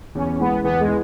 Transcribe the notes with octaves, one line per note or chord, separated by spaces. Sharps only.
E2 C#4
E3 G#3 B3
E2 B3
G#3
E3